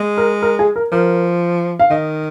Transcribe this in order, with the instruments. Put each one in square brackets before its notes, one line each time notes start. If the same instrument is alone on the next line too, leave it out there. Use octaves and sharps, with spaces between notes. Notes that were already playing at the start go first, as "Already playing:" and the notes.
Already playing: [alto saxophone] G#3
[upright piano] A#4
A#4
G#4
A#4
[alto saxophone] F3 [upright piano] A#4
[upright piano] F5
[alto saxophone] D#3 [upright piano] D#5